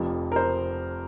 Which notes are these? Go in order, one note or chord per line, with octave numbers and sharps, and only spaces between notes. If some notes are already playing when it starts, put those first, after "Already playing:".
Already playing: F1 F2 F3
A#4
C5